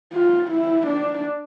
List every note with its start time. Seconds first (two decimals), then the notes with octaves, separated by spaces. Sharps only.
0.13 F4
0.51 E4
0.87 D4